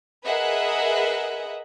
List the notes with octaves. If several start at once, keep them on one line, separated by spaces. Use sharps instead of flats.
G#4 A#4 B4 D#5 E5 F#5